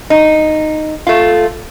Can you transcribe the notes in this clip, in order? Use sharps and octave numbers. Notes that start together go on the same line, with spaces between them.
D#4
A3 F4